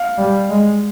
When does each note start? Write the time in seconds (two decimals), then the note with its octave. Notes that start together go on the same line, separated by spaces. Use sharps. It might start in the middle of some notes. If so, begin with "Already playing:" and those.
Already playing: F5
0.18 G3
0.49 G#3